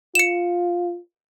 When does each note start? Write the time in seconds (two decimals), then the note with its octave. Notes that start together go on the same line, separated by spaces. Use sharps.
0.15 F4 C#7 E7